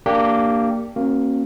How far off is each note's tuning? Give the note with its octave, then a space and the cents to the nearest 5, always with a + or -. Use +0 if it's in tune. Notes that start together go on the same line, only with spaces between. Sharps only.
A#3 -15 D4 +0 G4 +0
A#3 +0 C#4 -35 F#4 +0